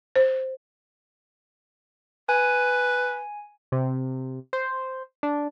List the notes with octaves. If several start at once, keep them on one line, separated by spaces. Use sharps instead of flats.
C5
B4 G#5
C3
C5
D4